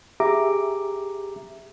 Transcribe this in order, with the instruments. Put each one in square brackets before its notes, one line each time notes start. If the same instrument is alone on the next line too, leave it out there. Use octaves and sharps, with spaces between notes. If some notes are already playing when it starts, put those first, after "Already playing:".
[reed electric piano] G4 G#4 E5 A#5 D6